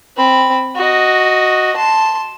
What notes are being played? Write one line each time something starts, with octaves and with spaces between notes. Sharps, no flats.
C4 B5
F#4 D#5
A5 C6